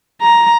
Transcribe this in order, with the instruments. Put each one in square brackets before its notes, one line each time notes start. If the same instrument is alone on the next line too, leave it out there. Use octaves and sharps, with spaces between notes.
[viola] A#5